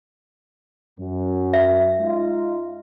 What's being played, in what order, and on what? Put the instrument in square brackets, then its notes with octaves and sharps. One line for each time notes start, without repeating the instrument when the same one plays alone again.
[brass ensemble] F#2
[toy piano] E5
[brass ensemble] G#3 D#4 F4